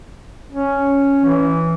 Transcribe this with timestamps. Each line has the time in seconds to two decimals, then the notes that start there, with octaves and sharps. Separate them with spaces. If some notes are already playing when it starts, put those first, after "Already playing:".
0.52 C#4
1.25 E3